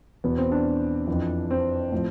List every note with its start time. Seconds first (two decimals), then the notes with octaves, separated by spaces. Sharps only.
0.24 E2 B2 B3
0.37 C4
0.52 D4
1.07 F2 E3
1.51 C4
1.92 A2 F3